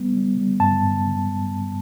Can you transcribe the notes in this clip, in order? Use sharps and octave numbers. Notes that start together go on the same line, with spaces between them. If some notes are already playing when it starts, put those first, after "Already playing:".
Already playing: G3 B3
G3
G3
G2 A5
G2